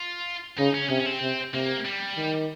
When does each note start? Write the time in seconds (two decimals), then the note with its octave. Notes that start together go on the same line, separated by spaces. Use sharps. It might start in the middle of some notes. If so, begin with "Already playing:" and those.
Already playing: F4
0.58 C#3 D#4
0.74 C#4
0.90 C3 C#4
1.00 C#4
1.06 C4
1.21 C3
1.54 C3 A#3
1.85 G3
2.17 D#3